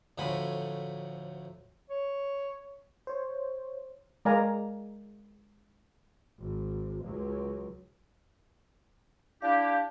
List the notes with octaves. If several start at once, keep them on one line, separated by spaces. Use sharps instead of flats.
D2 A2 F3 F#3 G#5 B5
C#5
C5 C#5
G#3 A#4 D5 F5 G#5 A#5
G#1
C#2 F#3
D4 E4 G4 F5